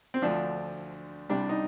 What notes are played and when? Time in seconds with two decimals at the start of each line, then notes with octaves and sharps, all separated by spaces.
0.14 C4
0.22 D2 D3 F3 D4
1.29 C2 C3 G3 D4
1.49 D#4